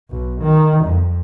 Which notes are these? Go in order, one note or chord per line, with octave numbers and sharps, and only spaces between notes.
B1
D#3
F2